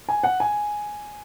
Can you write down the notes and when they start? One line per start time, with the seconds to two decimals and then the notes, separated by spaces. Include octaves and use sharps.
0.09 G#5
0.23 F#5
0.40 G#5